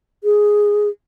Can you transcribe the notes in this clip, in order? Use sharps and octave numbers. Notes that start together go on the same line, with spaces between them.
G#4